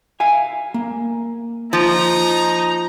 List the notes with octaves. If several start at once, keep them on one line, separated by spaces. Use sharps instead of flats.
E5 F5 G#5
A#3
F3 D#4 A#5